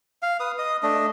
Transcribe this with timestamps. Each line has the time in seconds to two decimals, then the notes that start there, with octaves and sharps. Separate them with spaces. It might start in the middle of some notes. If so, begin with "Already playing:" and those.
0.22 F5
0.40 B4 D#6
0.58 D#5 D#6
0.83 A3 D4 D#5